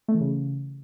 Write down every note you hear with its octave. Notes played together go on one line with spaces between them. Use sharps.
A3
E3
C#3